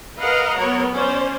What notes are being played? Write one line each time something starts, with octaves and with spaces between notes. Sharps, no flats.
A#4 B4 D#5 F5 F#5 A#5
F#3 B3 A#4 C#5
C#4 C5 D5